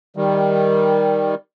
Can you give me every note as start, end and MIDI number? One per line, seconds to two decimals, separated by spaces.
0.17 1.35 51
0.17 1.35 55